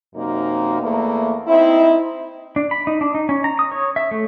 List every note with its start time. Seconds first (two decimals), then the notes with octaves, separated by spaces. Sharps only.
0.16 F#2 C3 A#3 D#4
0.82 E2 A3 A#3
1.48 C4 D#4 E4
2.56 D4
2.71 B5
2.87 D#4
3.01 D4
3.15 D#4
3.29 C#4
3.44 A#5
3.59 D#6
3.72 C#5
3.96 E5
4.11 A3